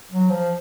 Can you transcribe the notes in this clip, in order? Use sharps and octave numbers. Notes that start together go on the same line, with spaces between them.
F#3
F3